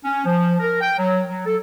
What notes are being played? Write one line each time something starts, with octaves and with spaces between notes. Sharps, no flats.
C#4
F3
A#4
G5
F#3
F#3
A4